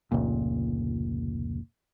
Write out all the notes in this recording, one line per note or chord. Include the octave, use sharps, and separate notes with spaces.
F1 C#2 A#2